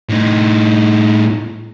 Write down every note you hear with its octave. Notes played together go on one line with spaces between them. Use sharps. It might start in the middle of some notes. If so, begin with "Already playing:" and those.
A2 D#4